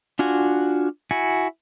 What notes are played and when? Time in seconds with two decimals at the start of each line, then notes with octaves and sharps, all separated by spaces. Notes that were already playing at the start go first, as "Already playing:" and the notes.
0.19 D4 F4 F#4 G#5
1.11 E4 F#4 G#5